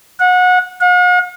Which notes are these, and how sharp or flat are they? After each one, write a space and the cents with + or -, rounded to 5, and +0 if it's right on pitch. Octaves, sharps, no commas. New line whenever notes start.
F#5 -25
F#5 -45